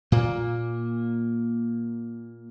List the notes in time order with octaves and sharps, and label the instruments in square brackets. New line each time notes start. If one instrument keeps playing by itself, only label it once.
[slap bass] A#2 A#3